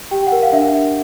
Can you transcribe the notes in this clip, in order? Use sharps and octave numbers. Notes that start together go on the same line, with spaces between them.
G4 G5
F#5
A#4
F5
D4 E5